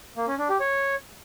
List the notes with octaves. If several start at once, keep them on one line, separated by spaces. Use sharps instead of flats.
A#3
C#4
D4
G4
C#5